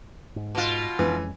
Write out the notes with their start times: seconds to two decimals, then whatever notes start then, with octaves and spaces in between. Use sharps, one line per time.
0.36 G#2
0.55 B2 F4
0.99 F2 E3 G#3 C#4